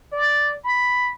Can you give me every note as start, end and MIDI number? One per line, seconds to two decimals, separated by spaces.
0.12 0.56 74
0.64 1.12 83